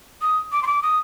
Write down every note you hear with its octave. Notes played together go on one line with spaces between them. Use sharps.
D#6
D6
C6
D6
D#6